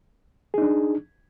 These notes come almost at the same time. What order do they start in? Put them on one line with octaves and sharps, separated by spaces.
G#4 D#4 D4